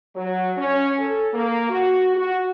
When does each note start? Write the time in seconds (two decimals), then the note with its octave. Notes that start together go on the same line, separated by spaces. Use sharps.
0.15 F#3
0.57 C#4
0.98 A4
1.33 A#3
1.69 F#4
2.16 F#4